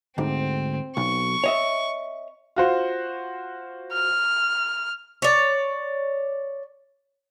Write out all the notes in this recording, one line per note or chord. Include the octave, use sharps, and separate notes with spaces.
D2 G#2 C4
B1 C#6
C#5 D#5 E5
F4 F#4 C5
F6
C#5 D5